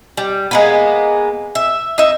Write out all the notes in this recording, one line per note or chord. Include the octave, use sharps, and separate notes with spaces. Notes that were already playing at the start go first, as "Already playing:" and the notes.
G3
G#3 A#3 B3
E5
D#4 E5